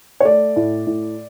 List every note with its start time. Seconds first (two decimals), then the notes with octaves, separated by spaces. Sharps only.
0.20 C#5
0.25 A3 D5
0.56 A2
0.87 A2